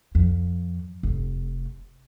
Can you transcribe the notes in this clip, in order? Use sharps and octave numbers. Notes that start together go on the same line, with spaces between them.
F2
F1